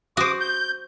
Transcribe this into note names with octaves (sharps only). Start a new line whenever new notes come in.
F#4 C5 D6 D#6
G6